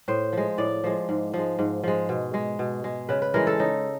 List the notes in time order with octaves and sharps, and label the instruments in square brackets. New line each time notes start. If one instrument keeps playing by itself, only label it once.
[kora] A2 C5
F3 G#3
A2 D5
F3 G#3
G#2
F3 G#3
G#2
F3 G#3
B2
G#3
B2
G#3
C#3 B4
B4
E3 G#3 A#4
A4
C#3 D#4